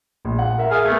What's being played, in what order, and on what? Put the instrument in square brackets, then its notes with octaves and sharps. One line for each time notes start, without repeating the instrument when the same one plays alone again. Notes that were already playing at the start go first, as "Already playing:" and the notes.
[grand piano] A#1
F#5
A#4 E5
[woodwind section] G#4 F5
[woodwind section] A3 [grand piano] B3 G#6